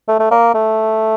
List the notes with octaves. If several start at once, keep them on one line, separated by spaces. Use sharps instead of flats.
A3
A3
A#3
A3